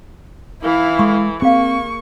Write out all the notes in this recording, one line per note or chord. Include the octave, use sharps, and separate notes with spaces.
E3 E4 F5
G#3 A4 C#6
A#3 C4 G#4 F5 C#6